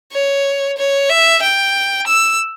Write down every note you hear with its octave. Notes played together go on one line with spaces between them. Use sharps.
C#5
C#5
E5
G5
E6